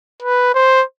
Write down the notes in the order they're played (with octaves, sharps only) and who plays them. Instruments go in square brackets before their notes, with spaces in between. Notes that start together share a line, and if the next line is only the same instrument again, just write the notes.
[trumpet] B4
C5